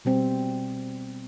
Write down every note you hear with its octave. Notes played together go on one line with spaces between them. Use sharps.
B2 G3 C4